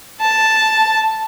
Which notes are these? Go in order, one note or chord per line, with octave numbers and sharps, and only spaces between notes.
A5